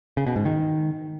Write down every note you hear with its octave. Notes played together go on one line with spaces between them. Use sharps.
C#3
B2
G#2
D#3